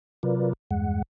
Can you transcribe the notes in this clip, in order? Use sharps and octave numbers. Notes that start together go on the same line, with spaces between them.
C3 F#3 F4 A#4 B4 D5
E2 G2 G#3 F#5